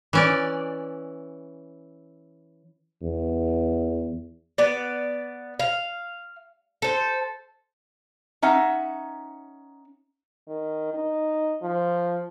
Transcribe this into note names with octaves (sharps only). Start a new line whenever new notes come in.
E3 C#4 D5
E2
B3 D5
F5
A4 C5
C#4 D#4 E5 F#5
D#3
D#4
F3